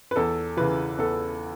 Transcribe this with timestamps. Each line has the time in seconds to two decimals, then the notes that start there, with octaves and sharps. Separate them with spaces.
0.11 B4
0.16 E2 A4
0.57 C#3 E3 B4
0.98 E2 A4